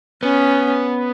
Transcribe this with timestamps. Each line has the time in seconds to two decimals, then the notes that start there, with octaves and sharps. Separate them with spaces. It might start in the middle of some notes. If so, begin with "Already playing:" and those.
0.23 B3 C#4